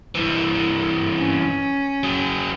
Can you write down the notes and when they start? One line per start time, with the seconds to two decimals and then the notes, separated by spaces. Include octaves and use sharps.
0.15 G2 E3
1.18 C#4
2.03 F#3 G#4